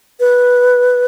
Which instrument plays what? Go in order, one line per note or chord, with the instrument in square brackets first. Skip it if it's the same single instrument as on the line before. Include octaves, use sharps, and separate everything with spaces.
[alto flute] B4